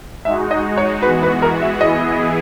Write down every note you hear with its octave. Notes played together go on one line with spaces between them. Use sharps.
G#3 D#4 F#4 E5
D#5
C#5
E3 G#3 B3 F#4 B4
B4
A#4
E5
E3 B3 E4 G#4 D#5